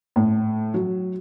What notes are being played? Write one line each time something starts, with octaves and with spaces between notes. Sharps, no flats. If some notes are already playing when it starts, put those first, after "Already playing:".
A2
F#3